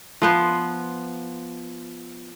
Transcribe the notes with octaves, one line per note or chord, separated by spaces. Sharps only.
F3 B3 C5